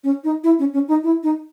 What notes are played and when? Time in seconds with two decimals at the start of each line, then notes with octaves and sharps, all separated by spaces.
0.04 C#4
0.24 D#4
0.44 E4
0.59 C#4
0.74 C#4
0.88 D#4
1.04 E4
1.23 D#4